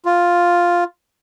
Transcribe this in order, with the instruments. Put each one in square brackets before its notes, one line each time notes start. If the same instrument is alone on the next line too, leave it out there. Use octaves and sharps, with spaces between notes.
[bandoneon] F4